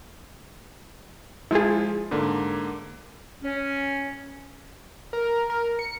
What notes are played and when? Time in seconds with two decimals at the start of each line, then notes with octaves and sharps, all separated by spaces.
1.51 F3 G#3 E4 F4 G#4
2.11 G#2 D3 A#3
3.42 C#4
5.13 A#4
5.50 A#4
5.79 C#7